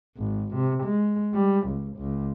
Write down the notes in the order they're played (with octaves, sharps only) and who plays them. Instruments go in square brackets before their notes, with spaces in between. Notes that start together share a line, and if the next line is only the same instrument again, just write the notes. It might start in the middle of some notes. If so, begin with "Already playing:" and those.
[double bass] G#1
C3
G#3
G3
C#2
C#2